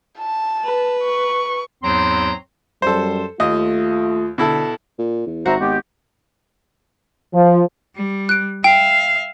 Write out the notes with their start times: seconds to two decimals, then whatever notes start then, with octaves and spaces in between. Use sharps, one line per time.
0.19 A5
0.65 B4
1.03 C#6
1.83 E2 G#2 F#3 C4 A#5 C6
2.82 F#2 G3 A4 C5
3.40 D#2 A3 F4 D#5
4.38 B2 D3 E4 A4
4.99 A#2
5.27 E2
5.46 G#1 F#4 C5 E5 A#5
5.60 G#1 G#3 B3 G4
7.34 F3
7.95 G3
8.29 F#6 D7
8.64 E5 F5 G5